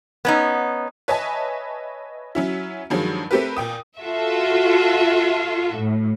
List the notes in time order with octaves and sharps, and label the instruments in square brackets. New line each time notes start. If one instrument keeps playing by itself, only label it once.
[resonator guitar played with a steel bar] B3 C#4 D#4
[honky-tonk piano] B4 C#5 D#5 E5 G#5 A5
F#3 C#4 E4
G2 D#3 F3 F#3 G#3
A3 C4 G4 A#4 B4
A#2 G5 D#6
[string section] F4 F#4 A4 E5
A2